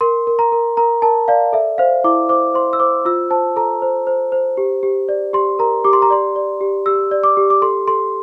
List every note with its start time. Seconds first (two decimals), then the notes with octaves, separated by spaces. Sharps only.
0.01 A#4 C6
0.27 A#4
0.39 A#5
0.52 A#4
0.77 A#4 A#5
1.02 A#4 A5
1.28 D5 F5
1.53 A4 E5
1.78 C5 F5
2.04 E4 D6
2.29 C5 D6
2.54 C5 C6
2.73 E6
2.80 C5 D6
3.05 F4 E6
3.30 C5 A5
3.56 A4 A#5
3.82 C5
4.07 C5
4.32 C5
4.57 G4
4.83 G4
5.09 D5
5.33 G4 C6
5.59 A#4 A#5
5.85 G4 D6
5.93 C6
6.02 A#5
6.10 D5 C6
6.36 D5
6.61 G4
6.86 G4 E6
7.11 D5
7.24 D6
7.37 G4
7.50 D6
7.62 A4 C6
7.87 A4 C6